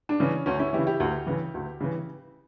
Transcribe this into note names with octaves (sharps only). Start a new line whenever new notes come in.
D4
C#3 E3 C#4
D2 C#4
C#4 E4
C#3 E3 E4 G4
E4 G4
D2
C#3 E3
D2
C#3 E3